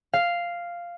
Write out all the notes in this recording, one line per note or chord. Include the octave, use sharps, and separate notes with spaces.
F5